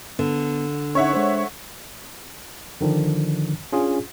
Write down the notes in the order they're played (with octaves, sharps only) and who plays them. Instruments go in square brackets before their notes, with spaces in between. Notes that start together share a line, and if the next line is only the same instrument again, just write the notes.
[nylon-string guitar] D3 [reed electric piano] B3
[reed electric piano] C#4 D#4 [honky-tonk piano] C#5 E5 F#5
[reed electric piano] G#3 D4 C5
[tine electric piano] D3 D#3 F3 D4
C#4 D4 F4 G#4